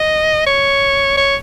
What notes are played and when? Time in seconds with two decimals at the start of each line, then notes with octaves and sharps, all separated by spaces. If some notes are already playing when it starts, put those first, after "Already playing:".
Already playing: D#5
0.47 C#5
1.17 C#5